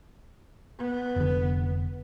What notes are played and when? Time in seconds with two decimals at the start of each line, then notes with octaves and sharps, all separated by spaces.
0.79 B3
1.16 F1 D3